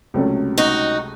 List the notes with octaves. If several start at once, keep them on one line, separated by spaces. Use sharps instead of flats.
C#2 C3 F#3 A3 C#4
D#4 F#4